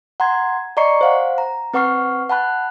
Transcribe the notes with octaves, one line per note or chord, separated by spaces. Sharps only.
F#5 A#5 C6 G#6
D5 D#5 A#5 C#6 C7 C#7
C5 F5 F#5
A#5
C4 B4 F#5 C#6 F6 C7
F#5 A5 B5 F#6